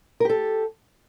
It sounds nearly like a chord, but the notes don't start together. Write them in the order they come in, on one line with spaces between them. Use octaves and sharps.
A#4 G4 A4